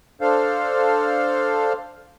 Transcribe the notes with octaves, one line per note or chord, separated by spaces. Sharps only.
D4 A4 C5 F5